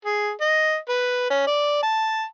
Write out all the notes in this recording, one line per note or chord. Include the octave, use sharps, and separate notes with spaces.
G#4
D#5
B4
C#4
D5
A5